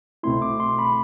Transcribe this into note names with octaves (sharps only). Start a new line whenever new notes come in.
C2 B2 A3 C4 E4 C6
D6
C6
B5